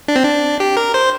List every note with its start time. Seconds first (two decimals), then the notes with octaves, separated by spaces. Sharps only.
0.08 D4
0.16 C4
0.24 D4
0.60 G4
0.77 A#4
0.94 C5